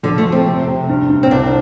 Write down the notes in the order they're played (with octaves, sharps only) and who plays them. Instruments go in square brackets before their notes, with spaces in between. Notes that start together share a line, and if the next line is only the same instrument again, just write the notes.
[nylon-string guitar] D3 [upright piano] F3
[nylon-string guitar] A3
[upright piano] F3
[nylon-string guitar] C4
[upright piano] C3
C3
G2
G2
[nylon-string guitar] C4
[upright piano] C2 [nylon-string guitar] D4